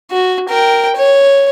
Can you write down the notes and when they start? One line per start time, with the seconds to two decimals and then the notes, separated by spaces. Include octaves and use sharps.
0.11 F#4
0.49 A#4 G5
0.96 C#5